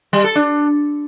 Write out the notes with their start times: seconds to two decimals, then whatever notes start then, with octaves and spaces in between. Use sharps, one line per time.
0.13 G3
0.24 A4
0.35 D4